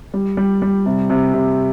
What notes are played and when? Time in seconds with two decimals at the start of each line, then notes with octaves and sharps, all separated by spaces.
0.14 G3
0.37 G3
0.62 G3
0.86 C3
1.10 C3
1.34 C3